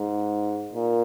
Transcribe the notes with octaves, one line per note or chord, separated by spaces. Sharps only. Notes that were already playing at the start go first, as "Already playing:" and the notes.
Already playing: G#2
A#2